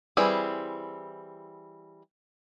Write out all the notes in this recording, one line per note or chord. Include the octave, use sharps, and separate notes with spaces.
E3 G3 C4 E4 G#4